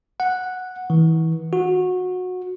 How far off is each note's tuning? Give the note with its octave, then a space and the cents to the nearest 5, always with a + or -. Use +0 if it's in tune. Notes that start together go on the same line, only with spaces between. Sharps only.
F#5 -5
E3 -30
F#4 -20